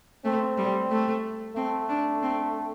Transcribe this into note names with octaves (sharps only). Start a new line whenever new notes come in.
A3 C4
G3
A3
A3 C4
D4
C4